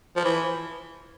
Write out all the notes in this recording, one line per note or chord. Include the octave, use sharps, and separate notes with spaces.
F3
E3